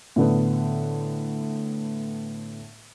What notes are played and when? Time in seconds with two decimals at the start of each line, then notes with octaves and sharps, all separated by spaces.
0.16 A2 D3 A3 B3